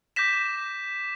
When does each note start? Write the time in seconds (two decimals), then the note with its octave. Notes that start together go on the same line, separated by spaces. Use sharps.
0.16 D6 G6 A#6 B6 E7